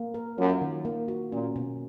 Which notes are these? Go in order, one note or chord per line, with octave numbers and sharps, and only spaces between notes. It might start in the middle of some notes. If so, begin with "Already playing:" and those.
Already playing: A#3
A#4
F#2 F4
D#3
A#3
F#4
A#2 C#4
B2